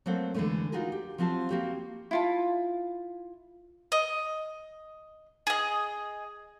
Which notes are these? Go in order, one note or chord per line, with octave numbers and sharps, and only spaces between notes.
F#3 A3 A#3 C4 C5 F#5
D3 E3 F#3 G#3 A3 C#4
D#4 F4 F#4 G#4 A#4
G4
F3 F#3 C4 F4 A5
A#3 C4 F#4 G4
E4 F4 A5
D#5
G#4 D#5